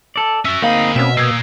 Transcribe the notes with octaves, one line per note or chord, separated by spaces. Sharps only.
A4 D5
C#4 F#4 E5
D2 A#3 C4 D#4 G#4 F5 B5
B2 C4 C#4 E5
A#2 A#3 D#6 E6 G#6 C7